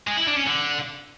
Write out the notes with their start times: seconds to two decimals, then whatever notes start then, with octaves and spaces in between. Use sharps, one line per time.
0.07 G#3
0.17 E4
0.27 D4
0.37 C#4
0.47 D3